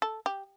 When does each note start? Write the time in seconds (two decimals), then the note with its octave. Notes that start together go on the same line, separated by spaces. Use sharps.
0.02 A4
0.26 G4